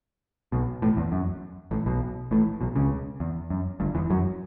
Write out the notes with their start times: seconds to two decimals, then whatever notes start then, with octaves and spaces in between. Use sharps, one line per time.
0.52 B1 B2
0.82 A1 A2
0.97 E2
1.12 F#2
1.71 A1 A2
1.86 B1 B2
2.31 A1 A2
2.61 B1 B2
2.76 C#2 C#3
3.20 E2
3.50 F#2
3.80 G1 G2
3.95 E2 E3
4.10 F#2 F#3